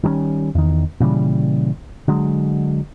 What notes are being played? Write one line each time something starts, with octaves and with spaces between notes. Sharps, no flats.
D#3 G3 G#3 C#4
E2 D#3
A#2 C#3 E3 G3
D3 F#3 G#3